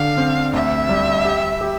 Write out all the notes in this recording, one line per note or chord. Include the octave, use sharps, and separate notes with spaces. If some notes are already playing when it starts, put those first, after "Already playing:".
Already playing: D3 F5
C4
D2 E5
G3
G4
G4